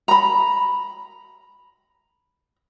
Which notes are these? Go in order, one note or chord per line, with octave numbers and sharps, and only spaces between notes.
A#5 B5